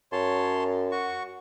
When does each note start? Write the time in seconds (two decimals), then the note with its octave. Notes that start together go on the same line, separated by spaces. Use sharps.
0.12 F#2 C#5 A5 C6
0.92 F#4 C#6